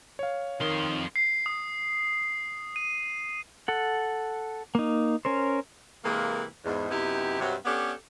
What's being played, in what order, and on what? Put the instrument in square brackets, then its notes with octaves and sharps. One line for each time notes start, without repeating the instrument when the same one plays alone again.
[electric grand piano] C#5 F5
[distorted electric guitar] F2 C6 [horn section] D#3
[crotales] C7
D#6
D#7
[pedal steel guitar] A4 F#5
A#3 D#4
C#4 A#4 C5
[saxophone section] C3 E3 G#3 A#3
E2 G#2
F#2 C3 B3 D#4 E4 G4
G2 C3 F#3
B3 C#4 D4 G4 A4